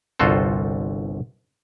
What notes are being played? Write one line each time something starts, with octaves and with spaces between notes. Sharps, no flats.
G1 C2 F4 F#4 A4 C5